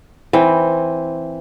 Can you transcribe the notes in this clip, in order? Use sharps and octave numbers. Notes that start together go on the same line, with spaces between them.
E3 C4